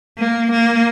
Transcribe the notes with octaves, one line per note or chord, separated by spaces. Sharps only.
A#3
A#3